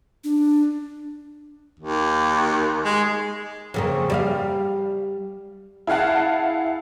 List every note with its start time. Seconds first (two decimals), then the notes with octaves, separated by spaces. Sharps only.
0.24 D4
1.80 D#2
2.85 G#3
3.74 F2 C#3 A#3
4.10 G3 D#5 F5
5.87 E4 G#4 F5 F#5 A5